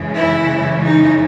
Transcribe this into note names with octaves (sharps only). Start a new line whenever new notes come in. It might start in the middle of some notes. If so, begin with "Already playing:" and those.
Already playing: F#2 C#3 E3 G#3
E4
D#4